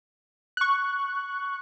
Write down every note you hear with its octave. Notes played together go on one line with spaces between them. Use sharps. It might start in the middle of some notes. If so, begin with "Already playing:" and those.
C#6 F#6